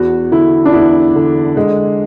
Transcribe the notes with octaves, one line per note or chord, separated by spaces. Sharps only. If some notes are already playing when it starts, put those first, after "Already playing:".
Already playing: E2 F#4
D3 E4
D4
E2 E4
D3
D3 G#3